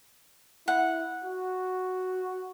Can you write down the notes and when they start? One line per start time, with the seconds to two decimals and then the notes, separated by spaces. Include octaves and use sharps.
0.68 E4 F#5
1.24 F#4